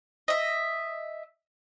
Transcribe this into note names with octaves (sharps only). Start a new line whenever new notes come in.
D#5 E5